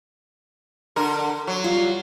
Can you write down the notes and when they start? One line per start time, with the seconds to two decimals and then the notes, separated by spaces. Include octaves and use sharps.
0.96 D3 A#4
1.47 F#3
1.64 G3 F4 F5